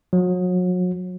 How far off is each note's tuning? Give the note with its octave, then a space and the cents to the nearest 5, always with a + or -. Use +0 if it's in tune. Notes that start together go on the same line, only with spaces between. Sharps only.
F#3 -35